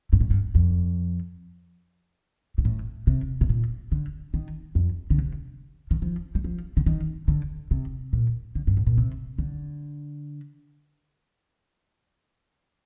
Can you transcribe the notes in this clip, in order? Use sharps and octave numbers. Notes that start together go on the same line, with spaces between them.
G2
A2
G2
F2
A#2
A2
C3
C3
A#2
D3
D#3
F2
D3
C3
D#3
F3
G3
F3
D3
D#3
D3
C3
A#2
D3
G2
A2
A#2
C3
D3